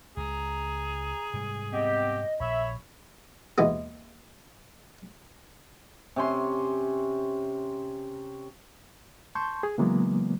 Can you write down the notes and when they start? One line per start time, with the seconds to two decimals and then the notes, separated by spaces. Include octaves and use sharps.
0.17 C#2 C#3 G#4 A#5
1.33 G#2 C3 G3
1.72 B3 C4 G4 D#5
2.40 A#1 C#5 E5 B5
3.58 D#2 B2 E3 G#3 B3
6.16 C3 C#4 C6
9.35 A5 C6 C#6 G6
9.63 G#4
9.78 C#3 E3 F#3 G#3 A#3 B3